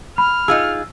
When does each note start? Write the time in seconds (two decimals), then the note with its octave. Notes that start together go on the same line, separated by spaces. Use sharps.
0.18 B5 F6
0.48 D#4 F4 G#4 E6